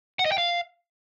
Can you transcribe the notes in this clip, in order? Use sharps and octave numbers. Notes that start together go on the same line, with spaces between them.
F#5
D#5
G5
F5